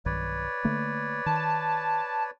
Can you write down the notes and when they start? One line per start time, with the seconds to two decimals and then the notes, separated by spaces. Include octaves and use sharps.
0.06 B1 G2 D#3 B4 C#5 D5
0.65 D3 A3 A#3
1.26 D#3 A5